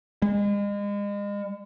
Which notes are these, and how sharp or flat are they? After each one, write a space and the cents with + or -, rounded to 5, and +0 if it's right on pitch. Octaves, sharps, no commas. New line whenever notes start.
G#3 -35